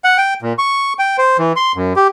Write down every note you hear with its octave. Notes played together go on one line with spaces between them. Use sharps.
F#5
G5
A#2
C#6
G5
C5
E3
C6
F#2
G4